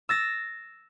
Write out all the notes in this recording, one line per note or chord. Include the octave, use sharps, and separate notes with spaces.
E6 A6 A#6